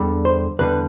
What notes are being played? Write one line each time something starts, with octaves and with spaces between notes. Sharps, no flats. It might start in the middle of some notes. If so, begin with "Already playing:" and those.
Already playing: E2 D3 G3
C5
E2 D3 G3 B4